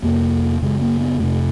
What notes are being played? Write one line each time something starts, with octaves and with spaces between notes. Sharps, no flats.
F2 C3 A#3
F#2 C#3 G#3
A#3
B3
F2 C3 A3